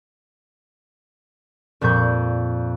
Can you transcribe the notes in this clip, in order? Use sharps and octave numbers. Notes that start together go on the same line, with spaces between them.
F2 A#2 G3 C#6 G6